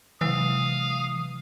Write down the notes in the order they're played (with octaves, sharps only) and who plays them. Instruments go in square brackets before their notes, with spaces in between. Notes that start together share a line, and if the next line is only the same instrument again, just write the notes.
[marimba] C3 F#3 G#3 [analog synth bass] E3 [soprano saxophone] F5 [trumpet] D#6